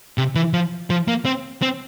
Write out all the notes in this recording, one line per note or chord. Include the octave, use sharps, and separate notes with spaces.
C3
E3
F3
F3
A#3
C4
C4